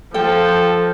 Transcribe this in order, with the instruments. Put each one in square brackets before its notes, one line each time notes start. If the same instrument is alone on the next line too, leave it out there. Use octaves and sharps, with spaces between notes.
[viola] F3 [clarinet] A4 [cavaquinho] G5